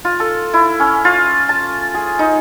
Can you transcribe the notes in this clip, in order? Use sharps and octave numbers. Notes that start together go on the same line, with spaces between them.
F4
A4
E4
C#4
F4
A5
G#4
D#4